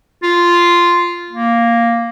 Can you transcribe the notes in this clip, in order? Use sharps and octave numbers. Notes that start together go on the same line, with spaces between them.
F4
A#3